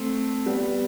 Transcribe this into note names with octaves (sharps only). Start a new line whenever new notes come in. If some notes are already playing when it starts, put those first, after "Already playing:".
Already playing: A3 C4
G3 B3